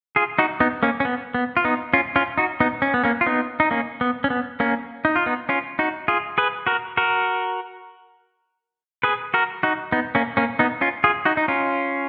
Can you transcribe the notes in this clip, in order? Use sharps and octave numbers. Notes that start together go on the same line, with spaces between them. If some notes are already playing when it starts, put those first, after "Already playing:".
F4 G#4
D#4 F#4
B3 D#4
A#3 C#4
C#4
B3
B3
F4
B3 D#4
C#4 F4
C#4 F4
D#4 F#4
B3 D#4
C#4
B3
A#3 C#4
F4
B3 D#4
D#4
A#3 C#4
B3
C#4
B3
A#3 C#4
D#4
F4
B3 D#4
C#4 F4
D#4 F#4
F4 G#4
G#4 B4
F#4 A#4
F#4 A#4
G#4 B4
F#4 A#4
D#4 F#4
B3 D#4
A#3 C#4
A#3 C#4
B3 D#4
C#4 F4
F4 G#4
D#4 F#4
D#4
C#4 F4